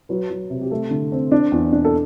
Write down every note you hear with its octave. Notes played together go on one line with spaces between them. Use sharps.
F#3 B4
F#3
C3
G4
A3 A4
D3
C4
D4
E2
D4
A4